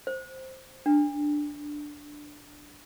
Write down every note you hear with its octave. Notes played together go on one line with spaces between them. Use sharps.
C5
D4